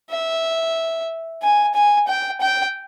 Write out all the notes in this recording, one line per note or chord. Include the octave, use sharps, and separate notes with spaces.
E5
G#5
G#5
G5
G5